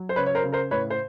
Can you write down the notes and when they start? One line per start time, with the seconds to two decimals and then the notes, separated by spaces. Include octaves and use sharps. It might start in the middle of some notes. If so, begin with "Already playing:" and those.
Already playing: F#3
0.09 C5
0.16 C#3 B4 C#5
0.26 C#5
0.35 A#4 C5
0.43 C#3
0.52 A#4 C5
0.71 A2 B4 C#5
0.90 C5